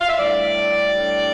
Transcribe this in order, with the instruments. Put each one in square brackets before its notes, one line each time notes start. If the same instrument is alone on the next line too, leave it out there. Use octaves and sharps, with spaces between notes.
[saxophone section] F5
E5
A2 G3 D4 D5
A2 G3 D4